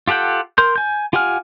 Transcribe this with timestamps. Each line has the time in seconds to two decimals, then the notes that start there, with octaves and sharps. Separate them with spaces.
0.08 F4 G4 A4 F#5 G5
0.58 A#4 C6 G6
0.76 G#5 G6
1.13 F4 G4 F#5 G#5 F6